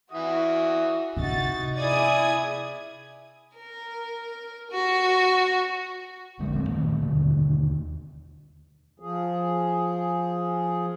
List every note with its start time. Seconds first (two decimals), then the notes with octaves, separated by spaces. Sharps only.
0.12 E3 F#4 E5 D#6
1.17 C3 D4 D#4 F#4 A6
1.77 E4 G#4 D5 D#6 G#6
3.56 A#4
4.71 F#4
6.39 A#1 D3 G#3 A#3
6.55 E1 A3 A#3 C4
6.69 A#2 D#3 A3 A#3
7.02 D#2 B2 D3
9.00 F3 G#4